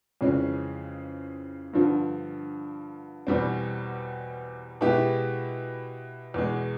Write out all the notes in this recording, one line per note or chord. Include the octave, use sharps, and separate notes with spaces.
F2 C#3 E3 G#3 C#4
G2 D3 F3
E2 B2 G3 C4
B2 G#3 B3 E4 G4
E2 B2 G#3